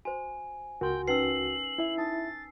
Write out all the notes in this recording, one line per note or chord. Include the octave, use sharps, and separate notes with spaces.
F#4 C5 G#5
C#2 F#4 A#4 G5 C6
C#4 D#4 B4 E6 C7 F#7
E4 E5
D#4 A5 D#6 A6